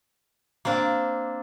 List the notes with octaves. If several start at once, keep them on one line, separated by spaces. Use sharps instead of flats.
A#3 C4 D4